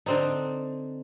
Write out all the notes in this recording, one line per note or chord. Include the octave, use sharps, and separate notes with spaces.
D3 C4 D#4